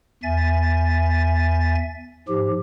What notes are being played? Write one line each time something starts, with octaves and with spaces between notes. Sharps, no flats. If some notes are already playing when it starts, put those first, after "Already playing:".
E2 E5 G#5 A6
G#2 F3 G4